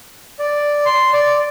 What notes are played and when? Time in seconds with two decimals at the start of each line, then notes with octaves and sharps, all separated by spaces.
0.39 D5
0.85 C6
1.13 D5